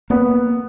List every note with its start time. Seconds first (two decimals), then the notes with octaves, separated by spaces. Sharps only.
0.10 A#3 B3